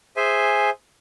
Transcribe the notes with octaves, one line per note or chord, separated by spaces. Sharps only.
G#4 C5 E5 G#5